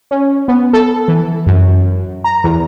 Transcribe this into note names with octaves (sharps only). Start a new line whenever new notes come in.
C#4
B3
A4
E3
F#2
A#5
E2